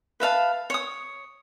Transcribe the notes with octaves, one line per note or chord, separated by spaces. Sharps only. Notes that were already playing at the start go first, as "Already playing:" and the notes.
B4 E5 F5 A5
C#5 D#6